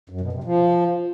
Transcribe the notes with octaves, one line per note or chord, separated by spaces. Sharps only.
F#2
B2
C3
F3